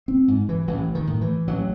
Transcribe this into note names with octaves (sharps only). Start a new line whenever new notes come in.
C4
G#2
E3
A1 E3
D#3
A2
E3
A1 F#3